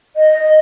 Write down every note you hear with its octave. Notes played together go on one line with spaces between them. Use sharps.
D#5